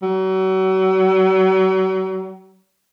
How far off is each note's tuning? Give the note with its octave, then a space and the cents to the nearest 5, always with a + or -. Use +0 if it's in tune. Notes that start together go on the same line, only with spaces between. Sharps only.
F#3 +35